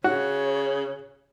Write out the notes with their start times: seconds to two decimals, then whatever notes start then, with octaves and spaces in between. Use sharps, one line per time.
0.04 C#3 F#4 C#5